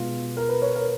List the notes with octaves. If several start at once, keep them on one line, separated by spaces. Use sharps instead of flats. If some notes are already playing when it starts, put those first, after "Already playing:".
Already playing: B2 G#3 B3 F4
A#4
B4
C#5
A#4